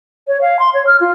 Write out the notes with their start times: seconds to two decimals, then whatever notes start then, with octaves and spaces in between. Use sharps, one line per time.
0.27 C#5
0.41 F5
0.59 C6
0.74 C#5
0.86 F6
1.00 F4